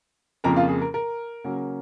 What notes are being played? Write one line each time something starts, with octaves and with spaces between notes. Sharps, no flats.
F2 C#3 F3 A#3 A#4 A#5
F4 F5
G#4
A#4
A#4
C#3 F#3 A#3 C#4